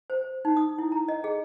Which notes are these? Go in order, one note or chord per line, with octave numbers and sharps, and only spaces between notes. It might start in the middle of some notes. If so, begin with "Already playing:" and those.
C5
D#4
D#6
E4
A#5
D#5
G#4